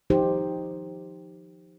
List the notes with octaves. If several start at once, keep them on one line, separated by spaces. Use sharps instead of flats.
F3 D#4 G4 C5